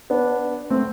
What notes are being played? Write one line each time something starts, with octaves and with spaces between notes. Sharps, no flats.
B3 D4
A3 C4